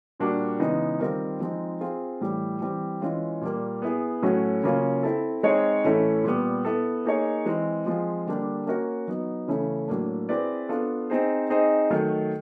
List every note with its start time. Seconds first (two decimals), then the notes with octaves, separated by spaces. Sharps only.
0.19 A#2 G3 A#3 D4 F#4
0.59 C#3 E3 G#3 B3 D#4
0.99 D#3 G3 C4 F4 A#4
1.40 F3 G#3 C4 D#4
1.81 C4 F4 G#4 C5
2.21 A2 E3 G3
2.61 E3 G3 C4
3.02 E3 G#3 C#4 F4
3.41 A#2 G3 A#3
3.82 B3 E4 G#4
4.22 A2 F#3 A3 C#4 F#4
4.63 C#3 F#3 A#3 C#4 F4
5.03 C4 E4 A4
5.43 G#3 C4 D#4 G#4 C#5
5.84 A2 E3 A3 C#4 E4
6.24 A#2 G3 B3
6.65 B3 E4 A4
7.05 A#3 D#4 G#4 C#5
7.46 E3 G#3 C4
7.86 F3 G#3 C4 F4 G#4
8.26 D3 G3 A#3 D4 G4
8.67 A#3 C#4 F#4 A#4
9.08 F#3 B3 D#4
9.47 C#3 E3 A3 C#4 E4
9.88 A2 F#3 A#3 D4
10.29 C4 E4 G#4 B4 D5
10.69 B3 D4 F4 A4
11.10 C4 D#4 G#4 C5
11.50 C4 D#4 G#4 C5 D#5
11.90 D#3 F#3 A3